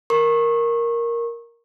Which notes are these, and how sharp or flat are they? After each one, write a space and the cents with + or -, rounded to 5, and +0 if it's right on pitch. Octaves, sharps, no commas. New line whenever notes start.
A#4 +0 C#6 -25